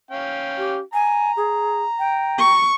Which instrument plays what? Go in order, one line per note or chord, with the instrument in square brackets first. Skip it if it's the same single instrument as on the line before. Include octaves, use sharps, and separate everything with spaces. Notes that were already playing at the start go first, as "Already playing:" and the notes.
[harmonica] C#4 F5 G5
[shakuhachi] G4
[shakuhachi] G#5 [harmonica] A#5
[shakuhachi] G#4
G5
[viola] C#6